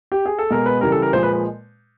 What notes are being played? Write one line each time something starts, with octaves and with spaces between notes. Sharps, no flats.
G4
G#4
A4
B2 G#3 A#4
B4
C#3 E3 G3 A#4
A4
A#4
A#2 F3 G#3 C5
B4
B4